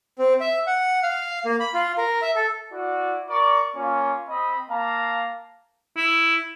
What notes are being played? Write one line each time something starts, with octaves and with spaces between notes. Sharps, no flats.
C4
E5
F#5
F5
A#3
B5
F4
A#4
E5
A4
E4 F#4 D5
A#4 D5 C#6
A#3 C#4 F4 C#5
C4 D#5 B5 D#6
A#3 F5 A5 A#5
E4